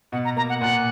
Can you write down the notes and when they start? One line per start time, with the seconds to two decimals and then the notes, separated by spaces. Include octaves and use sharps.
0.12 B2 F#5
0.25 A#5
0.36 A#3 A#5
0.50 F#5
0.61 A#2 F#5